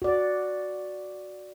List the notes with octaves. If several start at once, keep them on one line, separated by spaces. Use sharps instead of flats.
F#4 D5